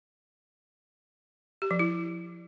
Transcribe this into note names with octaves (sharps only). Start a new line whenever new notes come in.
G4
F3
E4